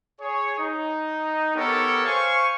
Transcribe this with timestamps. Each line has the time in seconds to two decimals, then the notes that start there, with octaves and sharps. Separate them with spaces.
0.20 G#4 C#5
0.59 D#4
1.55 B3 G4 A4 A#4 C#5
2.05 C5 F5 G#5 C#6